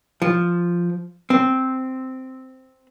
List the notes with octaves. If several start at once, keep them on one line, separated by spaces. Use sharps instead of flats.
F3
C4